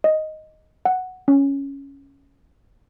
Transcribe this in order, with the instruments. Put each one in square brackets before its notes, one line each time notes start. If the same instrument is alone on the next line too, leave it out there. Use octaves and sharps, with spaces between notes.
[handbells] D#5
F#5
C#4